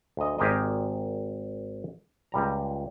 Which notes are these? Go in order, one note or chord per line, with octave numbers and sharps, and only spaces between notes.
D2 D#5
G#1 G4 G#4 A#4 C5 D#5
C#2 G3 A#5